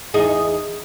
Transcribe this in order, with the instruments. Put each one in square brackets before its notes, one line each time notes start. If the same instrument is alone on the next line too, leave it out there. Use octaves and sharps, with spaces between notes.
[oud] E2 D#4 G#4